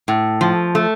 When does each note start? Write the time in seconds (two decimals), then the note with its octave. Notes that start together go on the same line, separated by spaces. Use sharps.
0.08 A2
0.41 F3
0.75 A3